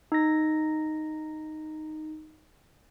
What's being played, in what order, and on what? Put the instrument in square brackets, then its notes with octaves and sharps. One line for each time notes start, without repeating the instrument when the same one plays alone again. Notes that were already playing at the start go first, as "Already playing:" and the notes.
[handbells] D#4 A#6